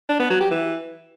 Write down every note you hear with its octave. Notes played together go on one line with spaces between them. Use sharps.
D4
B3
F#3
G4
E3